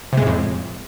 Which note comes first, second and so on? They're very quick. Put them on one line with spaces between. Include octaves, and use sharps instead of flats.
C3 G#3 A2 F2